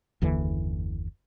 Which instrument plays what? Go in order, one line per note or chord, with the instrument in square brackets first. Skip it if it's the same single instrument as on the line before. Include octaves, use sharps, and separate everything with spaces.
[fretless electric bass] F#1 D#2 D3 E3